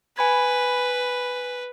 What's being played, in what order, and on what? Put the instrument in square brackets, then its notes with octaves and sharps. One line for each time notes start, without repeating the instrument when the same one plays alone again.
[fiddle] B4 [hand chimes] G#5 B5 G#6